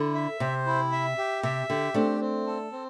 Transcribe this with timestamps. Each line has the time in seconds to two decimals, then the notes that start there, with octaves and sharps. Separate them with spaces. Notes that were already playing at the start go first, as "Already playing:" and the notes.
Already playing: D3 E4
0.15 E5
0.40 C3 C5
0.66 E4
0.92 E5
1.18 G4
1.43 C3 E5
1.69 D3 G4
1.94 A3 C4 D4
2.21 C4
2.47 A4
2.72 C4